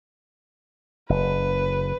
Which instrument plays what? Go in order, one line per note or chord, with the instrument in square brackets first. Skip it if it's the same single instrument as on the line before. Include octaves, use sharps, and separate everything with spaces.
[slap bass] F#1 [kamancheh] B4